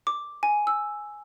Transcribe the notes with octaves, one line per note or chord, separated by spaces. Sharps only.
D6
G#5
E6